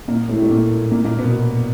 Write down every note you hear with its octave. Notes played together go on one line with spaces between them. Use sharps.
A#2 A#3
A2 A3
A3
A#2 A#3
A#2 A#3
A#2 A#3
B2 B3